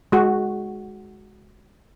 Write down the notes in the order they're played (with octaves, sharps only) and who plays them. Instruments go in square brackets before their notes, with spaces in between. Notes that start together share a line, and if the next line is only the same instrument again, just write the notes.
[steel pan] G#3 F#4